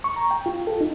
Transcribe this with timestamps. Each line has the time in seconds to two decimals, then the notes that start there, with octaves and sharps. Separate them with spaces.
0.04 C#6
0.16 A#5
0.31 G5
0.46 F4
0.67 A4
0.81 D#4